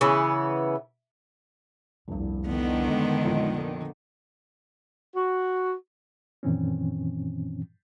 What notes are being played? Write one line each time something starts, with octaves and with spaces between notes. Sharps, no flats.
C#3 E3 B3
F1 C2 G2
D3 D#3 B3
G#3
F2 A#2 F3
F#4
F#2 A#2 D#3 E3 C4 C#4